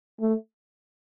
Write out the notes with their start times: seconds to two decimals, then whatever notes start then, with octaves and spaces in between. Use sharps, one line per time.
0.21 A3